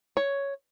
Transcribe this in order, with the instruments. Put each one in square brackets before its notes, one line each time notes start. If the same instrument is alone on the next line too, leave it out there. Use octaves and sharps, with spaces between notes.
[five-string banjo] C#5